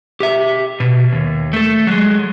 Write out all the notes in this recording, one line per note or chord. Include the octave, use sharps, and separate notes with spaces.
G4 E5
B2
D#2
A3 A4
F#3 G#3